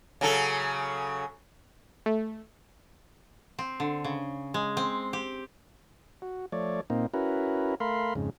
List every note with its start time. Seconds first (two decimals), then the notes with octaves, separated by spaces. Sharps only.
0.21 C#3 F#3 A4
2.06 A3
3.59 C4
3.80 D3
4.04 C#3
4.54 G#3
4.77 C4
5.13 G4
6.22 F#4
6.52 F3 A3 C#5 D5
6.90 A#2 A#3 C4 D#4
7.14 C#4 E4 F#4 A#4 B4
7.80 A3 A#4 F5 B5 C6
8.15 F2 G#2 C#3